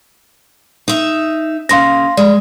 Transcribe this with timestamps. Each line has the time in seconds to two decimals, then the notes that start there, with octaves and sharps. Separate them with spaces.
0.88 D#4 E5
1.69 C#3 A#3 F5 C6 A#6
2.17 G#3 D5